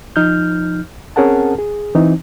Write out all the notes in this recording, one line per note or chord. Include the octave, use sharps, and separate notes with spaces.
F3 D#4 F6 G6
C4 C#4 G#4 A#4 F#5 A5
G#4
E3 C4 D#4